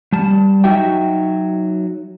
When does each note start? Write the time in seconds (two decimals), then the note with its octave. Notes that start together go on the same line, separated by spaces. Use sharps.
0.13 G3 A5
0.64 F#3 D#4 F#4 E5 G5